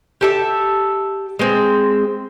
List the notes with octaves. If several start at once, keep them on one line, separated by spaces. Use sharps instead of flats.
G4 A4 E5
G#3 C4